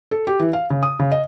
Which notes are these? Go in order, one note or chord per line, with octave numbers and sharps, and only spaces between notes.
A4
G4
E3
F5
C#3
D#6
C#3
D#5